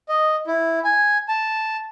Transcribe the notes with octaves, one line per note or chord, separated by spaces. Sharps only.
D#5
E4
G#5
A5